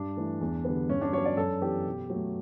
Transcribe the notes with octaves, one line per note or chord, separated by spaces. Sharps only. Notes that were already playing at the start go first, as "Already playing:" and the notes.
Already playing: G2 D4
E3 A3
E2
D3 G3 B3
G2 C#4
D4
F#3 B3 C#5
D5
F#2 A4
E3 B3 G4
B2
F#3 A3